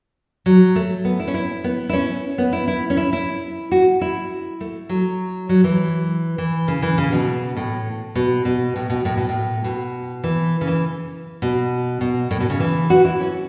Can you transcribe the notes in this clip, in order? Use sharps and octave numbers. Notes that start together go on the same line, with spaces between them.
F#3
A3
B3
E4
C#4
E4
B3
E4
C#4
B3
E4
E4
C#4
E4
E4
F#4
E4
A3
F#3
F#3
E3
E3
C#3
E3
C#3
B2
A2
B2
B2
A2
B2
A2
B2
A2
B2
E3
C#3
E3
B2
B2
A2
B2
C#3
E3
F#4
E4
C#4